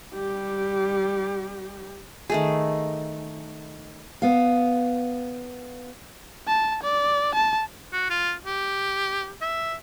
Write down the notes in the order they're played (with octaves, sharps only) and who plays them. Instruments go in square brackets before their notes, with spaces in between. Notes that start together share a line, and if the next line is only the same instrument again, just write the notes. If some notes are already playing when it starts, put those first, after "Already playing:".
[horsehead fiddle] G3 G4
[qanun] D#3 A3 G#4
[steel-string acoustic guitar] B3 F5
[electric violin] A5
D5
A5
[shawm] F#4
F4
G4
E5